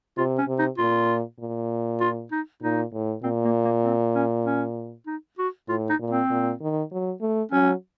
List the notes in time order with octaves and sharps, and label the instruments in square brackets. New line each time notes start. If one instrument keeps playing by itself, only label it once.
[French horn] C3 [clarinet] F4
[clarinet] C#4
[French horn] C3
[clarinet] D#4
[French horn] A#2 [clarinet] F4
[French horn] A#2
[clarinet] F4
D#4
[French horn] A#2 [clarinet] D#4
[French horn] A2
[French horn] A#2 [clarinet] C4
[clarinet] A#3
A#3
C4
C#4
C#4
D#4
F#4
[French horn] A2 [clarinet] F4
[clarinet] D#4
[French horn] A#2
[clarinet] C4
[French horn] A#2
D#3
F#3
A3
[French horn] F#3 [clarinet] C#4